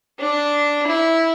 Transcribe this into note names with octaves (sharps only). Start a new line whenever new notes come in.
D4
E4